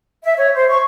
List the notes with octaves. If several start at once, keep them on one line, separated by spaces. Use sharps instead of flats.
E5
C#5
C5
C#6